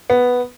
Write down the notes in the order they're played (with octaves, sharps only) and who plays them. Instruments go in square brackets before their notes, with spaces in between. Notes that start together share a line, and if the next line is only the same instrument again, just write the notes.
[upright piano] B3